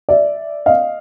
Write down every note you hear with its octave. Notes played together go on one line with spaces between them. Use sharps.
D5 E5
D#5 F5